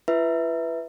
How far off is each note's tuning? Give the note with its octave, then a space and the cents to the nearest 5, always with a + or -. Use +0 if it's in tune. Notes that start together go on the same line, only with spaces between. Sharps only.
E4 +45 B4 +0 E5 -10